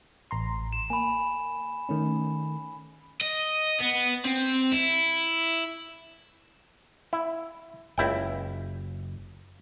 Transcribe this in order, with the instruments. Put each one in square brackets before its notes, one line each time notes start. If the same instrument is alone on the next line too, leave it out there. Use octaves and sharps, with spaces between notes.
[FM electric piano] A1 A#5 C6
[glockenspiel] E7
[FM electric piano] A#3 [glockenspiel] G#5 B5
[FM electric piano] D#3 A3 C#4
[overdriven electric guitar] D#5
B3
C4
E4
[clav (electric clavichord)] E4
[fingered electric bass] F#1 [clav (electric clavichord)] C#2 E4 G5